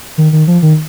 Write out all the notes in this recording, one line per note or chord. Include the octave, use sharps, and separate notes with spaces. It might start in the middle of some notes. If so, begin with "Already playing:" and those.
D#3
D#3
F3
D#3